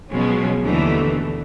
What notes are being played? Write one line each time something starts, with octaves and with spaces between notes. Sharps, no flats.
B2 F3 F#3 G#3 C#4
D#2 B2 D3 E3 A3